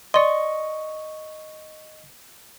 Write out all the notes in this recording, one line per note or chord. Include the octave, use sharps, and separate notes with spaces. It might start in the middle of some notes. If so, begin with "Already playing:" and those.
D5 D#5 C6 C#6